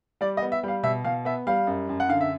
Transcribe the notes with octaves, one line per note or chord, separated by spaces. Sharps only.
G3 D5
D#5
B3
E5
G3 F5
B2 E5
B2 F5
B3 E5
G3 F5
F#2
F#2
F#5
D3 F5
E5